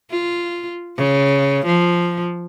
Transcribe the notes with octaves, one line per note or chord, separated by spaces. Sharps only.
F4
C#3
F3